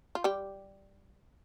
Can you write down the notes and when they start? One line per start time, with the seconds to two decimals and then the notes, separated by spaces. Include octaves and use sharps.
0.15 F4
0.24 G3 G4